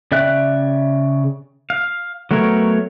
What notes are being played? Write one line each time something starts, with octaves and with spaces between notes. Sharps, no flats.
C#3 D5 E5 G5 F#6
F5
F#3 A3 B3 A#4 C#5